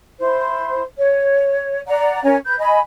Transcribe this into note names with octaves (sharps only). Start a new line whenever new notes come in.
E4 C5 C6
C#5
D5 F#5 A#5
C#4 A#4 C#5 G#5
B4 G6
D#5 G#5 B5